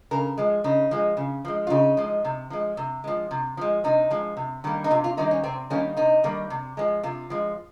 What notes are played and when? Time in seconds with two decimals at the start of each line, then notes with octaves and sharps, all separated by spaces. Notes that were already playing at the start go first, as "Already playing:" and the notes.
0.11 C#3 A#4
0.38 F3 G#3
0.64 C#3 D#4
0.91 F3 G#3
1.17 C#3
1.45 F3 G#3
1.67 F4
1.70 C#3 D#4
1.97 F3 G#3
2.25 C3
2.50 F3 G#3
2.77 C3
3.04 F3 G#3
3.31 C3
3.57 F3 G#3
3.84 C3 D#4
4.11 F3 G#3
4.37 C3
4.64 D#3 G3 A#3
4.84 D#4
4.91 C3 F4
5.04 F4
5.17 D#3 G3 A#3 D#4
5.31 C#4
5.44 C3 C4
5.70 D#3 G3 A#3 C#4
5.97 C3 D#4
6.24 D#3 G3 A#3
6.50 C3
6.77 F3 G#3
7.03 C3 F4
7.30 F3 G#3